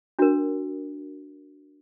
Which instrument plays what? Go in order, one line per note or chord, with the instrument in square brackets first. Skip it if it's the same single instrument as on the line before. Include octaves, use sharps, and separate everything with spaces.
[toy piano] D4 F#4 A#4